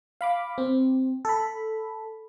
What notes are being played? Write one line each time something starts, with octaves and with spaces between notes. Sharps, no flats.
F5 B5 D6
C4
A4 B5